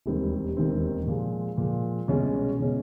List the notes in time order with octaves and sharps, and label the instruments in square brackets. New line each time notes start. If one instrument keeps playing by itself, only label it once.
[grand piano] E1 D#2 D#3 G3 C4
E1 D#2 D#3 G3 C4
A#2 F3 G#3
A#2 F3 G#3
C2 B2 G#3 C#4
B2 G#3 C#4